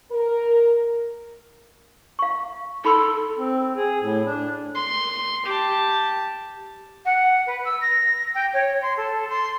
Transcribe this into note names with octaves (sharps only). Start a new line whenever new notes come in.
A#4
F5 C#6
D#4 A4 B5 C6
C4
G#4
A2
D4
C6
G4 A5
F#5
B4
E6
A#6
G5
C#5
C6
A4
C6